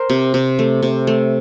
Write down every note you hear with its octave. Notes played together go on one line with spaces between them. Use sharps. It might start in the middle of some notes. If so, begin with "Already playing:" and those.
Already playing: A#4 C5
C3
C3
A3
C3
A3